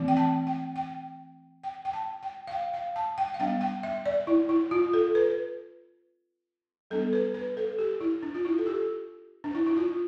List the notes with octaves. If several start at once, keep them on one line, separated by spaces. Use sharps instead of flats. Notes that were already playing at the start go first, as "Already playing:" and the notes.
Already playing: E3 A3 C4
G5
A5
G5
G5
G5
G5
A5
G5
F5
G5
F5
A5
G5
F5
G3 B3 D4 G5
G5
E5
D5
E4
E4
F4
A4
B4
G3 B3 D4 A4
B4
B4
A4
G4
E4
D4
F4
E4
A4
G4
D4
E4
E4
F4